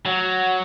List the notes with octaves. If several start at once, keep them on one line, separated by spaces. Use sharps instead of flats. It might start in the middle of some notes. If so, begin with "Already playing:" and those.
F#3